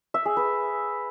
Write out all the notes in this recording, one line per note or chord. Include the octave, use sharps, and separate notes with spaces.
E5
G#4
B4